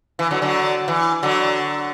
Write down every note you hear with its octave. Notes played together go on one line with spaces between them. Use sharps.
E3
D3 F#3
D3 F#3
E3
D3 F#3